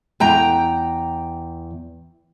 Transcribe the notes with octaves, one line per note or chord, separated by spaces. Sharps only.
E2 G5 A#5